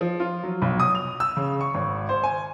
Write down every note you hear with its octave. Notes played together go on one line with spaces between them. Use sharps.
F3
F4
F#3
B1
D#6
F7
E6
C#3
C#6
G#1
C5
G#5